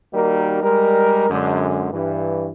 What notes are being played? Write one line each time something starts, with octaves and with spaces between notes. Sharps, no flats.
D#3 G3 A#3 D#4 F#4 A#4
G3 G#3 A#4
F#2 D3 G#3
G2 E3